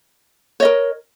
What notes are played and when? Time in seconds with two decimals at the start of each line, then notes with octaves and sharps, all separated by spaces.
0.60 C#5
0.62 D#5
0.65 A#4